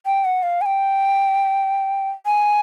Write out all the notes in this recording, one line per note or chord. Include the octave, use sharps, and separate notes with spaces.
G5
F#5
F5
G#5
G5
G#5